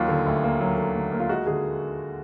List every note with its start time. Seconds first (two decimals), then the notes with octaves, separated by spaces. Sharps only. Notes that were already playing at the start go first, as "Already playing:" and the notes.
Already playing: D#2 F#3 F4
0.09 D3
0.27 D2
0.44 A#3
0.61 F#3
0.78 D3
0.96 D2
1.12 A#3
1.20 F4
1.29 G#3 F#4
1.47 D3 G#4